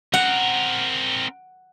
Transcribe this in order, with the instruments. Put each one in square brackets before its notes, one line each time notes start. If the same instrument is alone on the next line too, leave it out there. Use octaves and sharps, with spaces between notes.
[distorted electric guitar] C4 A#4 [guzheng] F#5